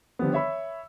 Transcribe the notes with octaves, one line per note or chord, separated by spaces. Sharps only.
D3 D#3 F3 G3 B3
C#5 E5 B5 E6